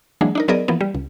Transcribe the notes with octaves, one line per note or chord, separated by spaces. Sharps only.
E3 F#3 G#3 A#3 D4 G#4
D4 D#4 A#4
F#3 B3 G#4 A#4 D5 D#5
E3 F3 A#3 B3
G3
C#2